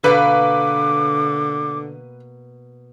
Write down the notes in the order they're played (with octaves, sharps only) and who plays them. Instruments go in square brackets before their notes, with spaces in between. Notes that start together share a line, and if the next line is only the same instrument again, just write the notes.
[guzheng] B2 A#3 [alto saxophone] D3 [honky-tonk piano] B4 [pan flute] D6